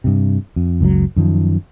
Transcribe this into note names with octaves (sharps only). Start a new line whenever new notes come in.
G2 C3
F2
F#1 C#2 C#3 F#3
F#2 D#3 F3